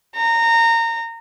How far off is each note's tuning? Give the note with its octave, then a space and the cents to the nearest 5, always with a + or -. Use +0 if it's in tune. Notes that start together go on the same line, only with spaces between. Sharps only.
A#5 -20